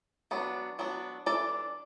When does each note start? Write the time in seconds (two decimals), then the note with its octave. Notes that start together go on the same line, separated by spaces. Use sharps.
0.31 F#3 B3 D4
0.79 F#3 B3 D4
1.26 E3 D4 A4 D5